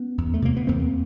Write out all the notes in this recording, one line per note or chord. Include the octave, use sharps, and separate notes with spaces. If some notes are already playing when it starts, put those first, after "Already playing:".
Already playing: B3 C#4
E2
A3
C3 A#3
B3
E2 A#3 C4